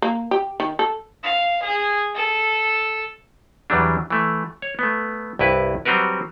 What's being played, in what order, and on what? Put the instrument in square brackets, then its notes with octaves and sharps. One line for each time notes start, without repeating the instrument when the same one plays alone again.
[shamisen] A#3
G4
D#3
A4
[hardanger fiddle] F5
G#4
A4
[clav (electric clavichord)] E2 E3 F#3 G3 D4
E3 A3
C#5
A3 B3
C2 G2 E4 B4
F#3 G3 C4 F#4 A#4 B4